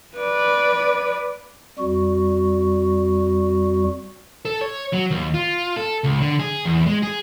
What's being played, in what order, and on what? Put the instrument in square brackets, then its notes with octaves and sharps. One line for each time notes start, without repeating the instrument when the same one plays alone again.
[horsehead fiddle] B4 D5
[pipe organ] F2 G3 F#4
[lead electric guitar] A4
C#5
F#3
D#2
F4
A4
C#2
D3
G#4
E2
G#3
G#4